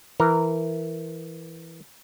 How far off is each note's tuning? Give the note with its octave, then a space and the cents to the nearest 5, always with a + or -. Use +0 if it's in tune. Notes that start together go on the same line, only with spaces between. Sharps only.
E3 +0 A#4 -10